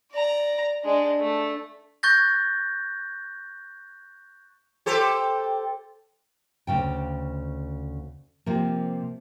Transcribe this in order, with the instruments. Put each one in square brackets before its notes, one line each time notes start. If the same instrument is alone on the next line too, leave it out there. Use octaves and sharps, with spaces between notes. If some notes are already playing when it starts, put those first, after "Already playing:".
[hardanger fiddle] D5 A#5
G#3 D4
A3
[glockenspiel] C#6 F#6 G6 A6 A#6
[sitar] G4 A4 C5
[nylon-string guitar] D2 C#3 G5
C3 F3 A#3